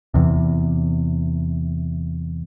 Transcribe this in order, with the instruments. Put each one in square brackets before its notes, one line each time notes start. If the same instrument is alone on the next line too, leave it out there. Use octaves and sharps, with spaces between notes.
[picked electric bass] E2 C3